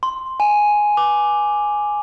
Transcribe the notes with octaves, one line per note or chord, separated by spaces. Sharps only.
C6
G#5
D6